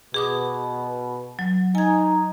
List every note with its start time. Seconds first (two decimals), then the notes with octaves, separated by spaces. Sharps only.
0.14 B2 G#4 D6 D#6
1.39 F#3
1.75 D#4 G#5 G#6